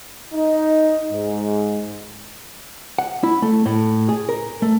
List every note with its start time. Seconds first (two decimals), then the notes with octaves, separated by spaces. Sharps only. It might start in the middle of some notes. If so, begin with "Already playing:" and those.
0.33 D#4
1.11 G#2
2.99 F#5
3.23 E4
3.42 A3
3.66 A2
4.09 G#4
4.29 A#4
4.62 A3